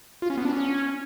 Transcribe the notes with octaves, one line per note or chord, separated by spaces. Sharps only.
F4
C#4
B3
D4
C#4